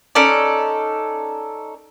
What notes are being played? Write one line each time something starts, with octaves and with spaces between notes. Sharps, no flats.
C#4 D#4 A4 D5